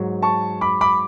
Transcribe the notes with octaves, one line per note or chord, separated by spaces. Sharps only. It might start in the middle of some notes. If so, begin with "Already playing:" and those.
Already playing: G#2 F#3
A5 C#6
B5 D6
B5 D6